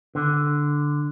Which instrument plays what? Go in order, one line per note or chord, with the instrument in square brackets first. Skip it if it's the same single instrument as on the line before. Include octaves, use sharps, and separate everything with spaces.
[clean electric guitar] D3